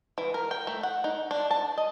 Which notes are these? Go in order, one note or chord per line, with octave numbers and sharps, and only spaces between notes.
E3
A#4
G5
A3
F#5
D#4
D4
A5
D#5